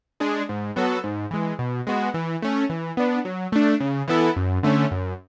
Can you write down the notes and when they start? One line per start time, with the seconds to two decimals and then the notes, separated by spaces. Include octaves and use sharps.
0.20 G#3 D4 G#4
0.49 G#2
0.76 F#3 B3 F#4 A4
1.04 G#2
1.31 E3 G#3
1.59 B2
1.87 G#3 B3 F#4
2.14 E3
2.42 A3 C#4
2.70 E3
2.97 B3 D4
3.25 F#3
3.52 A3 D4
3.80 C#3
4.08 E3 B3 E4 A4
4.36 F#2
4.63 D3 A3 C#4
4.91 F#2